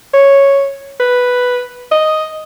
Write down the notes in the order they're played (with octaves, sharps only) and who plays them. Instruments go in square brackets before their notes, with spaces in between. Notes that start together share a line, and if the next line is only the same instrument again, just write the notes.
[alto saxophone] C#5
B4
D#5